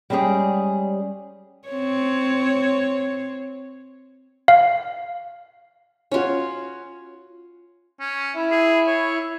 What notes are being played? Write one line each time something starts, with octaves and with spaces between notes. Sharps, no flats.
G3 G#3 C#4 G4 G#4 D5
C4 C#5
F5
C#4 F4 F#4 C#5
C#4
E4 E5
G#4
C#5